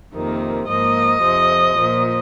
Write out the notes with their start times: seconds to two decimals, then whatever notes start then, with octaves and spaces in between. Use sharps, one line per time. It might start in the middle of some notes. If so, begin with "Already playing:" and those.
0.14 F2 C3 D#3 A#3
0.68 G#2 F3 A#3 D#5
1.23 F2 C3 F3
1.78 A#2 F3 A#3